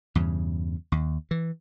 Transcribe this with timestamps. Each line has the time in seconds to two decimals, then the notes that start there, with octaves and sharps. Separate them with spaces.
0.15 E2 G2 C#3
0.92 D#2
1.31 E3